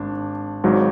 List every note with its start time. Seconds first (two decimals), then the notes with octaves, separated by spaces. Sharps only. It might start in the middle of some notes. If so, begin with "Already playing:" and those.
Already playing: G#1 D4
0.64 G#1 G#2 F#3